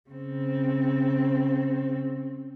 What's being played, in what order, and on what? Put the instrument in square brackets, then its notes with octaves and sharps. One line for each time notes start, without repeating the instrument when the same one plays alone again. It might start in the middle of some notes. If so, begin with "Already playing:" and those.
[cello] C#3 C4